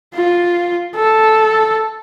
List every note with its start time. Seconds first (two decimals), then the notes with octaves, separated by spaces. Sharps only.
0.15 F4
0.96 A4